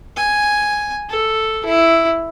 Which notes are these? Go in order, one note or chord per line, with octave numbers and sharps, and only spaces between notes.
G#5
A4
E4